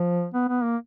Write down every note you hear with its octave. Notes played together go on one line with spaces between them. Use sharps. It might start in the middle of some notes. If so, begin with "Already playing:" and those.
Already playing: F3
B3
B3
A#3